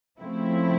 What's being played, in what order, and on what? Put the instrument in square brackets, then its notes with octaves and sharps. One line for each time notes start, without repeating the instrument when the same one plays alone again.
[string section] C#3 F3 A3 C4 E4